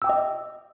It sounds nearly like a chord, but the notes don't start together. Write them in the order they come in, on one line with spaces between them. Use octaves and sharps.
E6 G5 D6 D#5